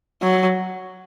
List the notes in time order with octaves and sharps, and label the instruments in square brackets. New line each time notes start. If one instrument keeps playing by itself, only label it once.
[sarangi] F#3